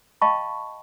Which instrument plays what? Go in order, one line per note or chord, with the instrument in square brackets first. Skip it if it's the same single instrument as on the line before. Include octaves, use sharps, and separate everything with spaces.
[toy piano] D#5 F5 G5 A5 B5 C#6